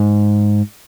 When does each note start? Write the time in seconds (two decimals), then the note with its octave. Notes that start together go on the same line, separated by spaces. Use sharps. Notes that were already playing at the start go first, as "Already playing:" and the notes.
Already playing: G#2